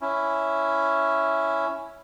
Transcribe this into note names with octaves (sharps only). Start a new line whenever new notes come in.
C#4 E4